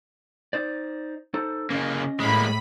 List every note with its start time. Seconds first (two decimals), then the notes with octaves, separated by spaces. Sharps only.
0.53 D#4 C5 D5
1.34 D#4 A4 C5
1.70 C#3 A#3 C#4 D#5
2.20 A2 G#3 A#3 B5